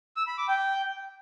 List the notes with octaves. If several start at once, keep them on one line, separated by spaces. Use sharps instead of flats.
E6
B5
D6
G5